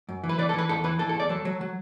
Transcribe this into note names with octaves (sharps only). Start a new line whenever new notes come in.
F#2
E3
B4
E3 D5
A4
E3 B4
E2 A4
E3 B4
E3 A4
A4
E2 D5
F#3 A4
F#3
F#3